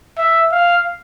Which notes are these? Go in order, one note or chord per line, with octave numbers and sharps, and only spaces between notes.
E5
F5